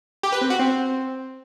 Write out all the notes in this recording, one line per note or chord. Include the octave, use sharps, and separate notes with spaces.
G4
B4
C4
F#4
C4